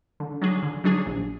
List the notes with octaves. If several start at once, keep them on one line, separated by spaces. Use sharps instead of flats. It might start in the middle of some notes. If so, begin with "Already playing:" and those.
D3
F#3 D4 G#4
D3
F#3 D4 G#4
A#1